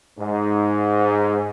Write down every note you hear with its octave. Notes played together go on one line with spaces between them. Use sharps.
G#2